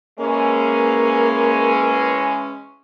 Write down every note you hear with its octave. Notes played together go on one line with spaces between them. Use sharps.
E3 G#3 A#3 C#4